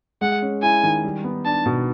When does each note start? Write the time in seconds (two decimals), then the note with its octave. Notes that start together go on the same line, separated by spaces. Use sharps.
0.21 G#3 F#5
0.42 C#4
0.62 E4 G#5
0.83 D#3
1.04 G3
1.24 B3
1.45 D4 A5
1.66 B2